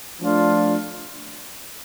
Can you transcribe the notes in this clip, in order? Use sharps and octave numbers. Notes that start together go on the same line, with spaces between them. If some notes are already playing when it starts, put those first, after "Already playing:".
F3 A3 D4 F4